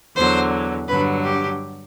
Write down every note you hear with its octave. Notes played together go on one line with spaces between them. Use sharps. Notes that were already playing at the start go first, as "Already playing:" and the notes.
E2 D3 F#3 C5
G2 D3 F#3 B4
G4